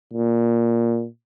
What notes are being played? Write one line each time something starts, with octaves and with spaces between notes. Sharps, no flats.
A#2